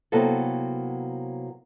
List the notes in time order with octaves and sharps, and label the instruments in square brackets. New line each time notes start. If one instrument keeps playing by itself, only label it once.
[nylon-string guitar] C3 F#3 A#3 B3 E4 A4